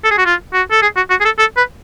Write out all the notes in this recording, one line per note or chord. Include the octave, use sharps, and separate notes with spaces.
A4
G#4
F#4
F4
F#4
A4
G#4
F#4
F#4
G#4
A4
A4
B4